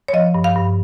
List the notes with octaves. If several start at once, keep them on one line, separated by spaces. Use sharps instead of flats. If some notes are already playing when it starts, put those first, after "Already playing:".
C#5
F3 D#5
G2
F5
G2